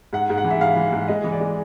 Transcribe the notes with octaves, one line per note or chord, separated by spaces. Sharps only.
G#2 F#5
G#2
F#5
E3
E5
G#2 F5
E3
G#2
G#3 D#5
E3
D5
G#3